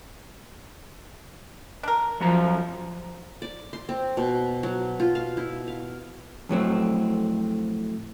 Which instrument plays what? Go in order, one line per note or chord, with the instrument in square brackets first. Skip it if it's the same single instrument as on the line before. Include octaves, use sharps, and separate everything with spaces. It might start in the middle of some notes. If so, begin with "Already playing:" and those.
[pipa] D4 A#4
[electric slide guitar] F2 F#3 A#5 [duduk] F3
[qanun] D5
C6
C4
B2
F#3
F4
F5
E4
F5
[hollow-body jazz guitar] F2 A2 F#3 C4